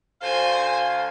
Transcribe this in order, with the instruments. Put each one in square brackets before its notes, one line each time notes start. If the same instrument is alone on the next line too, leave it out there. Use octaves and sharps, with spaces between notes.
[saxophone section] D2 F5 [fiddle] C5 G#5